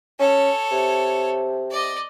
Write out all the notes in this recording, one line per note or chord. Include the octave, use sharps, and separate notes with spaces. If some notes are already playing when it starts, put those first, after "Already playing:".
C#4 A4 C#5
C3
D5 D#5